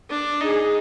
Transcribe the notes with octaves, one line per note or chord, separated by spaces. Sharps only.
D4
D#4 G#4